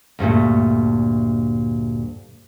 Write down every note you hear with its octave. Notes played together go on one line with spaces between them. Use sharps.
D2 G2 A#2 A3